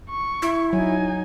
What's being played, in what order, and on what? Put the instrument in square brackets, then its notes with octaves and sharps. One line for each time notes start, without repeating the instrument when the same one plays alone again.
[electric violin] C#6
[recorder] E4
[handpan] F#3 [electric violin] D#4 G#5